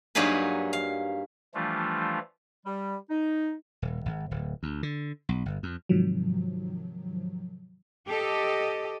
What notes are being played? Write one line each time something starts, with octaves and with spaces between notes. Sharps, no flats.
G2 F#3 A#3 D#4 G#4 B4
F5
E3 F3 G3 A3 D4 F4
G3
D#4
D#1
G#1
D1
D2
D3
B1
G1
F2
G#2 C3 D#3 F3 F#3
G4 A4 D#5